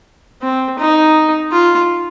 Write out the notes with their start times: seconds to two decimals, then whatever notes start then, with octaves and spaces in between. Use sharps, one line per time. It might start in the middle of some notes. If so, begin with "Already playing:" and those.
0.43 C4
0.79 D#4
1.52 F4